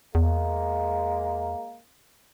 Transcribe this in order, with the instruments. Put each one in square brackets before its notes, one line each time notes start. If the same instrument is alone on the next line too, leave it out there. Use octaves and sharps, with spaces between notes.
[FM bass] E2 [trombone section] G#3 A#3